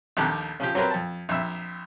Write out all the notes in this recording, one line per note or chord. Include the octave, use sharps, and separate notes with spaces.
A#1 D#2 G4 A4 F#6
C#3 F3 G4
F#3 C4 G4 A#4 B4
F2 A5
A#1 F2 E5